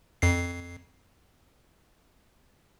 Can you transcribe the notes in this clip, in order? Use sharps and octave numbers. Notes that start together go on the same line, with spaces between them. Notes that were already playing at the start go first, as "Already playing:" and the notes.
F2 C7